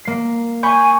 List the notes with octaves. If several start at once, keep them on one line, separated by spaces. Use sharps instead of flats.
A#3 C7
G#5 B5 C#6 G6